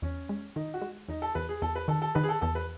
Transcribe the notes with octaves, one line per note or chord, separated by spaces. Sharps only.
E2 C#4
G#3
D#3 D#4
F#4
G#3
E2 D#4
A4
E2 B4
G#4
E2 A4
B4
D#3 A4
A4
D#3 B4
G#4
A4
E2 A4
B4